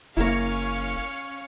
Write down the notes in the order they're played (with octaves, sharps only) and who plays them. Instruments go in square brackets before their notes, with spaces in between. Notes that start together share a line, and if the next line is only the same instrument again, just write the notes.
[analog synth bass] F#1 [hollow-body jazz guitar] A#3 E4 [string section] C#4 C#5 F5